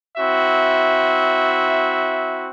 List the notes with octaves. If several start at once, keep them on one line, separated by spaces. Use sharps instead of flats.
C4 E4 F#4 E5